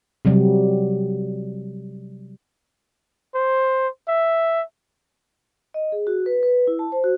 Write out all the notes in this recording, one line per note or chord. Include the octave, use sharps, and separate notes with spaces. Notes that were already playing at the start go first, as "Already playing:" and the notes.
C3 F#3 G3
C5
E5
D#5
G#4
F#4
B4
B4
E4
A5
C5
F#4